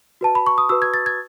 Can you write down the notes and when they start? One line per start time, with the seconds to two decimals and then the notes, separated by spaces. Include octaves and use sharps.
0.21 F#4 B4 A5
0.35 B5
0.46 C#6
0.58 D#6
0.69 F#4 B4 E6
0.82 G#6
0.94 A6
1.06 G#6